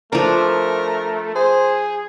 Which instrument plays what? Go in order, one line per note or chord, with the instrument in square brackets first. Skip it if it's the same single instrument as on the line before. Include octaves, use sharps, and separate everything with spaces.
[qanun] F3 D4 [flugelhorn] A3 [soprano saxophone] A#4
[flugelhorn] G#4 [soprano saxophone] C5